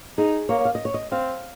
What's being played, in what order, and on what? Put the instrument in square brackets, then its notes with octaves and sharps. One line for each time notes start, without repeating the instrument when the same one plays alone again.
[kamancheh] D#4 [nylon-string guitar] G#4
[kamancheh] A#3 [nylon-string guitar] C#5
[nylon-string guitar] F5
D#5
C#5
D#5
[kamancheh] C4 [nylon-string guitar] F5